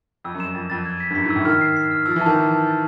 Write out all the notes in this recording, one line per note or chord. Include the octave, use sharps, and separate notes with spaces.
F2 E6
F#2
E7
F#2
F2 A6
F2 A6
G#6
B6
G2
F#2 B6
G#2 E6
A2
D#3 F6
C7
C7
F6
F3 E6
E3
D#3 A5
E3 A5
A5
A6